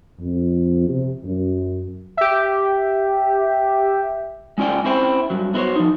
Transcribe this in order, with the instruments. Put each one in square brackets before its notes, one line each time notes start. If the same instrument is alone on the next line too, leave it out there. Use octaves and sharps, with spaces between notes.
[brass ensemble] F2
C3
F#2
[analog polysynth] G4 E5
[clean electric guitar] G#3 C#4 F4 D5 G5
C4 C#4 E4 C5 G5
G2 F#3
B3 E4 F#4 G4 C5 C#5
F3 D#4